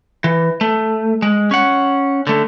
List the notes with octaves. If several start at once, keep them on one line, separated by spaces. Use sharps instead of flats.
E3
A3
G#3
C#4 F#5
D3 A3